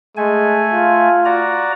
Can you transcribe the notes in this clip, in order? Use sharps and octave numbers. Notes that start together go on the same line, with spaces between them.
G#3 A3 G#5
F4
F#4 D5 A#5